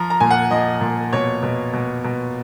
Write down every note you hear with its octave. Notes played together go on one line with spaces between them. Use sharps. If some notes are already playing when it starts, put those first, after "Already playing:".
Already playing: F3 A#5
A#5
A#2 G#5
F#5
F3 D#5
A#2
B2 C#5
B2
B2
B2